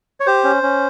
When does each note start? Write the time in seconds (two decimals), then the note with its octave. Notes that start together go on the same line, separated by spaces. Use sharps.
0.20 C#5
0.26 G4 C5
0.44 C#4
0.63 C#4